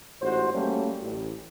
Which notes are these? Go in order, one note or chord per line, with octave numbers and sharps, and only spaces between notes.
A1 G#2 F#4 C5
F#3 G3 A3 A#3 C#4
A1